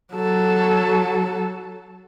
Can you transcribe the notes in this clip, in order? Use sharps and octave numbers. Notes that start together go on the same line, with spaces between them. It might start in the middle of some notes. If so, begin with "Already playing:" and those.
F#3 A4